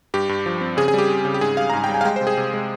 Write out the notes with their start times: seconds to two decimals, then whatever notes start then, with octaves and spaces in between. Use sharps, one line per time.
0.14 G2 G4
0.29 G2
0.46 F3
0.61 C4
0.77 C#3 G#4
0.88 G#4
0.94 G3 G4
1.09 C4
1.25 C#3
1.34 G4
1.41 G#2 G#4
1.57 G3 F5
1.70 A#5
1.73 G#2 G#5
1.84 G5
1.89 G3
1.94 G#5
2.01 F5
2.05 G#3 G5
2.16 C3 C5
2.27 G#4
2.37 C3
2.54 G#3